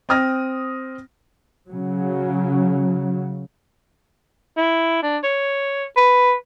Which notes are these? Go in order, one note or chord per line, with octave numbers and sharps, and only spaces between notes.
C4 G5 D#6 F6 A#6
C#3 F#3
E4
D4
C#5
B4